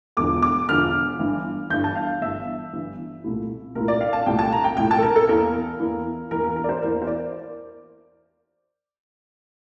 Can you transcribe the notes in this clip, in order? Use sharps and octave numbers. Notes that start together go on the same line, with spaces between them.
E1 E2 D3 F3 D6
D6
E1 E2 D3 F3 F6
G1 G2 E3
G1 G2 E3 G6
A5
F5
G1 G2 E3 E5
G1 G2 E3
C2 A#2 A3 E4
C2 A#2 A3 E4 A#4
D5
F5
A5
C2 A#2 A3 E4 G5
A5
A#5
G5
C2 A#2 A3 E4 G5
A5
A4
A#4
A4
E2 E3 A#3 E4 A#4
E2 E3 A#3 E4
E2 E3 A#3 E4 A#4
A#4
A#4
D5
C5
E2 E3 A#3 E4 A#4
C5
D5